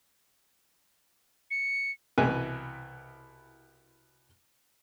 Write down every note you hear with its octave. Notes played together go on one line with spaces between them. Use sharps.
C#7
C2 B2 E3 E4 B4 G#5